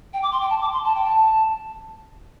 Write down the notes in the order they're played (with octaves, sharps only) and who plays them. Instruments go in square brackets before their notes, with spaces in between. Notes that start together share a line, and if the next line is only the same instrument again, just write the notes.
[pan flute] G5
D6
C6
G5
A5
D6
C6
A5
G5
A5